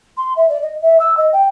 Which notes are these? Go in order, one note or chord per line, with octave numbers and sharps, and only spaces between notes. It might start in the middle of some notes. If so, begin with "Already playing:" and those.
C6
E5
D5
D#5
E5
E6
D#5
G5